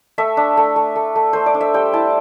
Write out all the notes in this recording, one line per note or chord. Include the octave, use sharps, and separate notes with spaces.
A3 E5
D4
A3
A3
A3
A3
A3 C5
D5
D4
E5
G3 G5
E4 A5